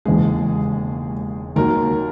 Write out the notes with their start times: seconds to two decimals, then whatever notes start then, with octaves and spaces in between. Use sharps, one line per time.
0.05 E1 D#2 C#3 E3 G#3 G#4
1.56 D#2 D#3 F#3 A#4